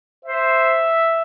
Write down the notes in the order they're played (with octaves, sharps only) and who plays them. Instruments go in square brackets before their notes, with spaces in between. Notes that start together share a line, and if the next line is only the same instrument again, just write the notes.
[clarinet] C5 [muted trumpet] E5